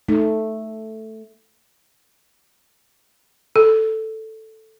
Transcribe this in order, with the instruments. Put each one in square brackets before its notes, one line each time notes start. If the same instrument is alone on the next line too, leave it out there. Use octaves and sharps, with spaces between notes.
[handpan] A3 [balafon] D#4
[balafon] A4